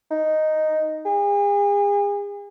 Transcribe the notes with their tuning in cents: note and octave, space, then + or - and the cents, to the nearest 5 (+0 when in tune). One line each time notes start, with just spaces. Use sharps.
D#4 +0
G#4 -40